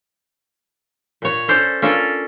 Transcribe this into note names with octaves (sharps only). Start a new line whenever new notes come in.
A#2 C#5
C#4 A4 C5 D5
C#4 D4 F4 A4 A#4